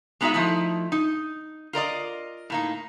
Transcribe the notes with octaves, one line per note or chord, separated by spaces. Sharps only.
G#3 B3 D#4 F#4 B4 E5
F3 A3 D#4 E4
D#4
F4 A#4 D5 D#5
A2 A#3 D#4